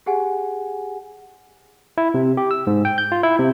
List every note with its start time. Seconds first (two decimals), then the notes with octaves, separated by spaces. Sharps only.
0.06 G4 G#4 F#5 G#5
1.98 E4
2.14 C3
2.37 G4
2.51 E6
2.67 G#2
2.85 G5
2.98 G6
3.12 F4
3.23 E4
3.39 C3